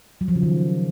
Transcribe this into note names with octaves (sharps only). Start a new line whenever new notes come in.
F#3
F3
C#3
D#3